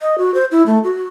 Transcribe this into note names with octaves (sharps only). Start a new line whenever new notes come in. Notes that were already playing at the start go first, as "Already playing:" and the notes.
D#5
F#4
C5
E4
A3
F#4